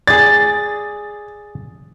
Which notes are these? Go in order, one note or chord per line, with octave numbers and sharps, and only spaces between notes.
G#4 D5 A6